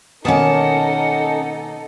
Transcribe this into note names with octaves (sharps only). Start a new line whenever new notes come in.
B2 D#3 A#3 C#4 D#4 A4 F#5 A5